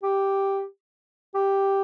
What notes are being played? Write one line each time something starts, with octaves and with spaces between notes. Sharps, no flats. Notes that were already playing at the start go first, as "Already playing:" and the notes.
G4
G4